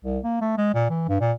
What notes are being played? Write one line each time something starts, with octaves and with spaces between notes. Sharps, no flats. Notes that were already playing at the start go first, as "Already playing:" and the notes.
C2
A#3
A3
G#3
A#2
E3
G2
A#2